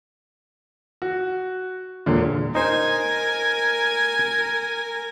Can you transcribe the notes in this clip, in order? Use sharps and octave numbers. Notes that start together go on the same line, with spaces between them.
F#4
E1 A#2 D3
D#4 A#4 C5 G#5